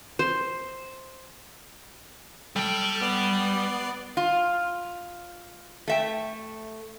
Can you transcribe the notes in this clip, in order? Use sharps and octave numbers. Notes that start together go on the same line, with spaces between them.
C5
G3 A4 G5 F6 G6
B3 D5 C7
F4
A3 E5 G5